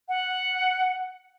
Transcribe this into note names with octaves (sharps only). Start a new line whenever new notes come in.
F#5